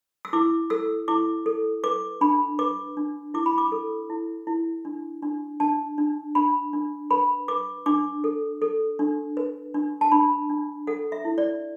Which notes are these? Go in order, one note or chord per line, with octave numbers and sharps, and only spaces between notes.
E6
E4 D6
A4 E6
E4 D6
A4
B4 D6
D4 B5
B4 D6
D4
E4 D6
B5
D6
A4
E4
E4
D4
D4
D4 A5
D4
D4 B5
D4
B4 B5
B4 D6
D4 D6
A4
A4
D4
B4
D4
A5
D4 B5
D4
A4 F#5
E5
E4
D5